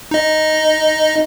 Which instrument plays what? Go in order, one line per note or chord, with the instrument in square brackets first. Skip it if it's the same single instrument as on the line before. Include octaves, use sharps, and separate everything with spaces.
[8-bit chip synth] D#4 D#5